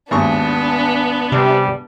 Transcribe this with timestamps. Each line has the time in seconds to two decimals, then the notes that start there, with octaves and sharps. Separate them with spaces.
0.11 G#1 D#2 B3 D4 C#6
1.32 C3 G3